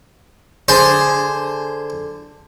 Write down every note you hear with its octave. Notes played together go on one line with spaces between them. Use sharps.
D3 G#4 C5